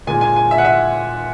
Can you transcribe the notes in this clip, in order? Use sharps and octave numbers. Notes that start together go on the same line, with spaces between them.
A#2 G#3 G#5
G#5
G#5
E5
F#5
E5